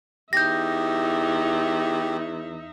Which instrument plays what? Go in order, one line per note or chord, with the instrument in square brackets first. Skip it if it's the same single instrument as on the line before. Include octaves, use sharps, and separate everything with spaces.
[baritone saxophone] E2 [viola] D#4 E5 [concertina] G4 [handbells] G6 A#6